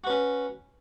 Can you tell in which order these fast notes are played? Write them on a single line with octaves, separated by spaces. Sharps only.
F#4 B4 C#4